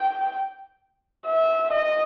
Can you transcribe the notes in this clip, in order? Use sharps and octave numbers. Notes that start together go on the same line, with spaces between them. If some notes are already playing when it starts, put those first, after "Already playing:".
Already playing: G5
E5
D#5